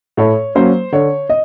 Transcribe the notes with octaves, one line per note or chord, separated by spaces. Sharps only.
A2 C#5
F#3 A#3 C#4 C5
D3 C#5
D#5